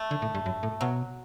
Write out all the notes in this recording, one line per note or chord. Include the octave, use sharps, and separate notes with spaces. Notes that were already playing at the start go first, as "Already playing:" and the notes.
Already playing: A3
D3
A2
G2
F#2
A2
B2 F#3